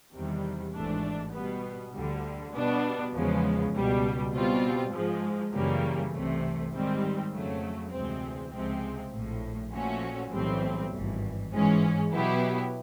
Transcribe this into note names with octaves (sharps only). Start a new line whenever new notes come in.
E2 C3 D#3 G3
G#1 G#2 E3 A3 D4
B2 G3 B3
D2 D3 G3
B2 G3 B3 D4
E2 C#3 F3 G#3 B3
C#2 B2 G3
B2 G3 C4 F4
G#2 F3 G#3
F#2 C#3 E3 G3 A#3
C2 C3 E3 A3
G#2 D#3 G3 C4
F2 C#3 F#3 A3
D2 C3 E3 G#3 C4
C#2 C3 F3 G#3 C4
A#1 A2 F3
A#2 F3 A3 C#4 F#4
B1 A2 E3 G3 C4
G#1 G2 E3
G#2 E3 G#3 C#4
B2 F#3 B3 E4 G4